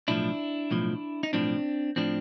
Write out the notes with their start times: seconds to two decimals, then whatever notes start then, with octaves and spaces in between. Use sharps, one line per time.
0.08 B1 A2 F3 D4 E4
0.71 B1 A2 F3
1.23 D#4
1.33 B1 A2 F3 C4 D4
1.96 A2 F3 C4 D4